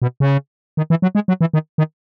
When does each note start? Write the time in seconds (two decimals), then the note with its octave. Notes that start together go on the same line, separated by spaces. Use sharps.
0.02 B2
0.20 C#3
0.77 D#3
0.90 E3
1.02 F#3
1.15 G#3
1.28 F#3
1.41 E3
1.54 D#3
1.78 D#3